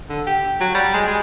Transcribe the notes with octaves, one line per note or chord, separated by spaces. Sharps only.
D3
G4
F#3
G3
G#3
G#3